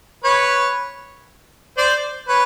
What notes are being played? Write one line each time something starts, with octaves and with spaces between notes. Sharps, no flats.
B4 C#5
C5 D5
B4 C#5